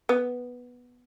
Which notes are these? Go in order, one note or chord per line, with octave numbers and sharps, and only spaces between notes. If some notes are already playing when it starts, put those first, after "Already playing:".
B3